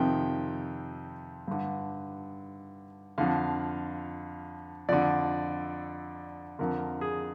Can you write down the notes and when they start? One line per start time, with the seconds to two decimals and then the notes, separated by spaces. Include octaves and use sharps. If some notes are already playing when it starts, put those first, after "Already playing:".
Already playing: F2 C3 D#3 G5
1.48 G2 D3
3.18 F2 D3 F5
4.89 F2 D3 D5
6.59 F2 D3 A#4
7.01 G#4